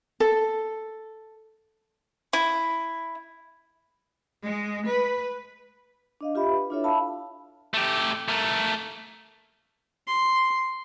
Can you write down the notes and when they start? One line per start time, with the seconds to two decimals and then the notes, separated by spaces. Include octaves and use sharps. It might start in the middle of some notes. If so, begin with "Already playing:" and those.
0.20 A4
2.33 E4
4.45 G#3
4.89 B4
6.21 D4 D#5 F5
6.35 F4 G4 E5 B5
6.48 B4
6.70 D4 E4 F4 A4 C#5 E5
6.84 E5 F5 A5 B5 E6
7.74 A3 G4
8.28 A3 A#4
10.07 C6